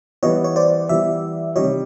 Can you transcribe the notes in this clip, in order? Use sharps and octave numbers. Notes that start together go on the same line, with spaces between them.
E3 G3 B3 C#5 D#5
C#5
C5 D5
E3 G3 B3 D5 E5
C3 D#3 G3 C#5 D#5